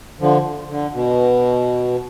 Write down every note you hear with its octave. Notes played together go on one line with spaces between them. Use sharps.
D3 F3
D3
B2